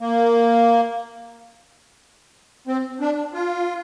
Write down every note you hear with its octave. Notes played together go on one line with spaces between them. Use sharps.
A#3
C4
D4
F4